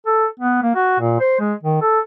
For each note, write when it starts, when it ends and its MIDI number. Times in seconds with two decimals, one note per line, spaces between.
0.06 0.27 69
0.40 0.60 59
0.63 0.71 58
0.76 0.97 66
1.00 1.19 46
1.20 1.39 72
1.40 1.54 56
1.63 1.79 51
1.82 2.00 69